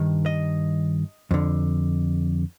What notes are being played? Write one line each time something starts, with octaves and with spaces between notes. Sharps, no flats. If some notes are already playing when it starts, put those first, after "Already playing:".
Already playing: G2 D#3
D#5
F2 D3